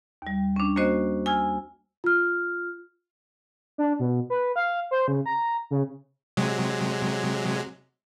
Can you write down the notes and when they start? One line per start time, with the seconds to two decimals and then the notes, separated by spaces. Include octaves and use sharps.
0.22 D#2 G3
0.56 C#4 D4
0.76 A#3 C#4 F#4 C5 D#5
1.26 G#5 E6 F6 G#6
2.04 F4 F6
3.78 D4
3.99 B2
4.30 B4
4.56 F5
4.91 C5
5.08 C#3
5.26 A#5
5.71 C#3
6.37 C3 F#3 G#3